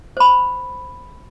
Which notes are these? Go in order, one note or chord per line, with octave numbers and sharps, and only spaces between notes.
C5 B5